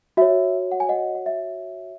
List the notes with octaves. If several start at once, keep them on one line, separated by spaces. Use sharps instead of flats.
F#4 C#5 E5
F#5
G#5
D#5 F#5
F#5
E5